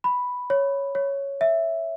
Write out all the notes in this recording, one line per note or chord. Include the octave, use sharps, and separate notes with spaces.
B5
C#5
C#5
E5